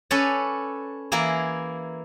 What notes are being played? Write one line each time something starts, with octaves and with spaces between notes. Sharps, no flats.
C#4 A4 B4 C#5 D5
E3 A#3 E4 G#4 A#4